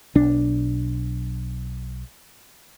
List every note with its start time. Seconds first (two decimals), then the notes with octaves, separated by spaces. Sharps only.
0.15 B1 D4